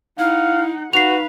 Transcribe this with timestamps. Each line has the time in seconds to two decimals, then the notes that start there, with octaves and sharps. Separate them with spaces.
0.19 D#4 E4 F5 F#5
0.93 D#4 F#4 B4 F5 C7 F7